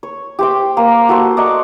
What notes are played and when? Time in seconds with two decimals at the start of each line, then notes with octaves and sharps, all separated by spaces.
0.03 C#5
0.39 G4 C5 G5
0.77 A#3
1.09 F#4 A4 C5
1.37 D5 D#5 F#5 A#5